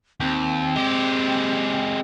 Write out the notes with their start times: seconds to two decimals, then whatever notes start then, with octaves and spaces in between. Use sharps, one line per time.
0.20 D#2 C4
0.76 G#3 G4